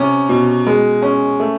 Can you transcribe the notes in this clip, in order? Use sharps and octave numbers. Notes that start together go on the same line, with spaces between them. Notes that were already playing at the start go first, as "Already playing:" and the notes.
Already playing: C3 C#4
B2
G#3
C#4
A3